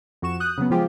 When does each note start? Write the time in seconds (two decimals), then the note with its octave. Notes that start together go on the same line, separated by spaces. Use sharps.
0.22 F2 F#4 C#6 E7
0.40 D#6 F#6 G6
0.58 C#3 F#3 B3
0.70 F3 G#3 F4 G4 G#4 C5